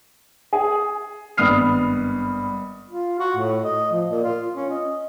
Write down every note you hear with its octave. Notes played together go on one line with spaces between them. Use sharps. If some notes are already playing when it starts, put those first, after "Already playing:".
G#4
G#1 G2 B3 D#6 F6 C7
F4
F#4
A2
D#5
F3
A#2
F4
C#4
D#5